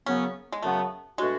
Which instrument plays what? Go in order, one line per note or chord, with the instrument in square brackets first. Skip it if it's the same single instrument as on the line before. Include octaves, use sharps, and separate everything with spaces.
[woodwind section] F#2 C#3 F#3 B3 [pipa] C#4
[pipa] G#3
[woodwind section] F#2 C#3 F#3 B3 [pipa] A3
[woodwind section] B2 A3 D4 F#4 [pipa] G#3